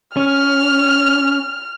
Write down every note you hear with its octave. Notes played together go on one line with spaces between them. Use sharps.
C#4 F6